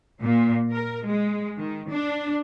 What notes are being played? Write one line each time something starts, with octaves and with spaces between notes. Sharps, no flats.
A#2
A#4
G#3
D#3
D4